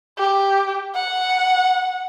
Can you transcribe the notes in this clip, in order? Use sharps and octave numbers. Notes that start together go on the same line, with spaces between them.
G4
F#5